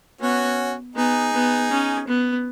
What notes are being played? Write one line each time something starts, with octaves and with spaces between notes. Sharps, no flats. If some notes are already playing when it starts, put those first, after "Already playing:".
B3 C#4 F#4
B3 D#4 G#4
B3
C#4
B3